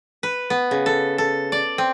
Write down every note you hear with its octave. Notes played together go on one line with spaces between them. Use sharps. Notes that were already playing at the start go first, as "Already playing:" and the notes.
B4
B3
C#3
A4
A4
D5
C4